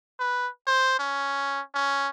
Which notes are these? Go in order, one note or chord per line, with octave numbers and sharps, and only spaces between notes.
B4
C5
C#4
C#4